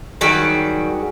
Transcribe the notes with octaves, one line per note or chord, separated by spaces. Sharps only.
D#3 F#3 G3 F#4 G#4